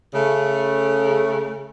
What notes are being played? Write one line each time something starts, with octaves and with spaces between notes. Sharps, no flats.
C#3 A3